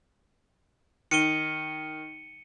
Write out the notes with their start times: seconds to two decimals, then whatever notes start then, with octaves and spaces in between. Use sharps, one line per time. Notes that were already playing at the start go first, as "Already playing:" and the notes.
1.11 D#3 C#7 D#7 G7